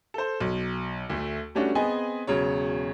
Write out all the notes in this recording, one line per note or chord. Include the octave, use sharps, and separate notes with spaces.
A4 C5
B1
D2 A3
G3 A3 C#4 D4 F#4
B3 C4 G#4 D#5 G#5
E1 C#3 F#3 C#5